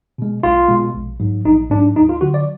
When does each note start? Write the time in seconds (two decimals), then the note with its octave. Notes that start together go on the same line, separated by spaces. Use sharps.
0.18 B2 G#3
0.43 B1 F4
0.68 B2 G#3
0.95 A#1
1.20 G#2 F#3
1.45 A#1 D#4
1.70 G#2 D4
1.75 F#3
1.96 D2 D#4
2.09 F4
2.21 D3 F#3 F#4
2.34 D5